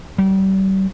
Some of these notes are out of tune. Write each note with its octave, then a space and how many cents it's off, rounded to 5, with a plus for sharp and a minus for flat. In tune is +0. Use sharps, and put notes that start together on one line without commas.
G3 -35